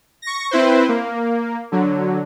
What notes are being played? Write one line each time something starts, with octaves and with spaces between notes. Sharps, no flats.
C#6 A#6
C4 E4 B4 C5
A#3
D3 F#3